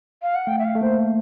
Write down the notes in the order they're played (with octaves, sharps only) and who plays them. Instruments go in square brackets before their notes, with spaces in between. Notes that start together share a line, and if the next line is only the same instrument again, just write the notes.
[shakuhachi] F5
F#5
[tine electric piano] A3 [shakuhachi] G5
[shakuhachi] E5
F5
[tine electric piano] A3
[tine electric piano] A#3 [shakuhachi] C5